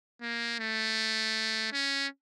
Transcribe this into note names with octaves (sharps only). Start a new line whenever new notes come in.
A#3
A3
C#4